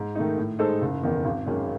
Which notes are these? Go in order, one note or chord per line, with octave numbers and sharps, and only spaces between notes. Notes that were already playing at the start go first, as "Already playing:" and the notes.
Already playing: G#2
D#3 A3 D#4
A2
G#3 D#4 A4 C5
F#1
E2 D#3
G#1
F#2 D#3 G#3 C#4